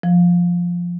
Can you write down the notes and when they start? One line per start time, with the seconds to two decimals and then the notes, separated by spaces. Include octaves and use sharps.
0.03 F3